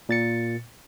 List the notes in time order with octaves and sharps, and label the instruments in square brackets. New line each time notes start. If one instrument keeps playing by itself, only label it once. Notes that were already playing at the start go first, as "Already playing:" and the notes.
[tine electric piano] A#2 A6 C#7